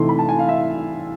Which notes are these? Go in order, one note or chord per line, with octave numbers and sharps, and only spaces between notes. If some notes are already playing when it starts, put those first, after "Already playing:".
Already playing: C3 E3 A3 C4 D#4 C6
B5
A5
G#5
F5
E5